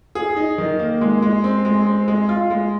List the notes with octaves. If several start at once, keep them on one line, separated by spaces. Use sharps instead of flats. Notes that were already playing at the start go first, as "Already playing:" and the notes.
G#4
D#4
D#3
A#3
G#3
G#3
C4
G#3
C4
G#3
F4
G#3